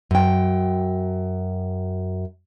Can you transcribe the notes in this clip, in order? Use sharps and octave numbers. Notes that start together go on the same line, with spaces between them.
F#2 G5